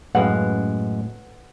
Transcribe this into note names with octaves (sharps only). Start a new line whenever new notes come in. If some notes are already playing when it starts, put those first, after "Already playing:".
F#2 A2 G#3 A4 B4 F#5 B5